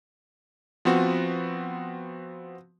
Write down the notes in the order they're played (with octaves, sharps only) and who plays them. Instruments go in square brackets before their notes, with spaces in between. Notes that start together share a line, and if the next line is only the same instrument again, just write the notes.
[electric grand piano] F3 B3 C4 F#4